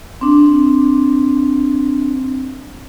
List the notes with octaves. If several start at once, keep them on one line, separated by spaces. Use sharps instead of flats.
C4 D4